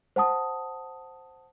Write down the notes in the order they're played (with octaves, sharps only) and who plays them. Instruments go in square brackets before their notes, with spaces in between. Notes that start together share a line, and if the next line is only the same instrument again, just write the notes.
[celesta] C5 F#5 A5 D#6